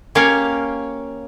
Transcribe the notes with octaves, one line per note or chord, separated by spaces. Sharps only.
A#3 C#4 G4 C#5 F5